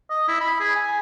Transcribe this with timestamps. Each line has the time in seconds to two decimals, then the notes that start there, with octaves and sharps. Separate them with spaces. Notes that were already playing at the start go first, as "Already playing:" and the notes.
0.10 D#5
0.28 E4
0.41 B5
0.60 G#4
0.75 G#5